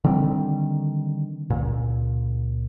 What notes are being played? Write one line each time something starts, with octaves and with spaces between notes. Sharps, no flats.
D3 D#3 G3 C4
C#2 A#2